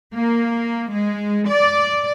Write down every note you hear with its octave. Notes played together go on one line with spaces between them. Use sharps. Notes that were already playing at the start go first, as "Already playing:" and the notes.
A#3
G#3
D5